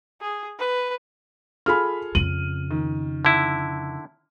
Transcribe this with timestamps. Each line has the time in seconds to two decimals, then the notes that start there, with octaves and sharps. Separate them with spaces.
0.21 G#4
0.59 B4
1.66 F4 G#4 A4 B5 F6
2.15 F2 C#3 D#7 F#7
2.71 D#3
3.25 D3 E4